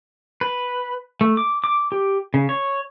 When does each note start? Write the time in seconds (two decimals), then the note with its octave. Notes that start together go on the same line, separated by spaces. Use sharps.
0.41 B4
1.21 A3
1.37 D6
1.64 D6
1.92 G4
2.34 C#3
2.49 C#5